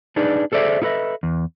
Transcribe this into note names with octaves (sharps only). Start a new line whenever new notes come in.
D4 D#4 G#4 B4 D5
G#4 A4 C5 D5 E5
D#4 E4 A4 B4 D#5 E5
E2